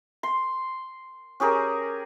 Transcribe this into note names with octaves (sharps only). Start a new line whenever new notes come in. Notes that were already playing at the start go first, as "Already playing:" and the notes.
C6
C#4 G4 G#4 A#4